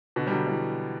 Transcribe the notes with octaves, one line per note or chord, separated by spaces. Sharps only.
B2 D3
G3
D3 F#3
E3 G3